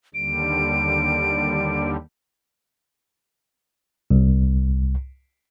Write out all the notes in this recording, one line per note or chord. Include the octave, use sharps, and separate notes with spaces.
D#2 D3 G3 D7
C2